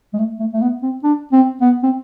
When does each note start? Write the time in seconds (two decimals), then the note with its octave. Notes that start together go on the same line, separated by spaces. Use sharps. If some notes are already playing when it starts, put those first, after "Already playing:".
0.14 G#3
0.19 A3
0.40 A3
0.53 A3
0.62 B3
0.83 C4
1.04 D4
1.32 C4
1.61 B3
1.83 C4